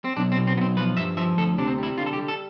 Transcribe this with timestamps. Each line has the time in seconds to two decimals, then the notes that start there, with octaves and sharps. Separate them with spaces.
0.04 C4
0.17 B1 D4
0.32 C4
0.37 B2
0.47 C4
0.57 B1 B3
0.61 C4
0.77 F3 B4
0.97 G2 E5
1.17 F3 E5
1.38 D2 A4
1.58 C3 D4
1.67 C4
1.78 G3 E4
1.98 D3 F4
2.06 A4
2.13 G4
2.19 G3
2.28 A4